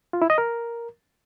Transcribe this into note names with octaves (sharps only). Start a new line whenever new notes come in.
F4
E4
D#5
A#4